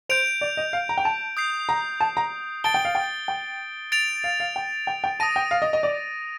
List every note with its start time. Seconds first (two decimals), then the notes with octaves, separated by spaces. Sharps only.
0.09 C5 G6 D7 F7
0.41 D5
0.57 D#5
0.73 F5
0.89 A#5
0.98 G5
1.05 A5
1.37 D#6 G6 C7
1.69 A#5
2.01 A5
2.17 A#5
2.64 A5 A6 D7 G7
2.74 G5
2.85 F5
2.95 G5
3.28 G5
3.92 A6 D7 F7
4.24 F5
4.40 F5
4.56 G5
4.87 G5
5.04 G5
5.20 A5 D#6 A#6 D#7
5.36 G5
5.51 F5
5.62 D#5
5.73 D#5
5.83 D5